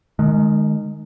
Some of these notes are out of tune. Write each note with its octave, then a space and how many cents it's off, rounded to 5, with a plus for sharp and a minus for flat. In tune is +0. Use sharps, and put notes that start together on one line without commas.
D#3 -20 G#3 +25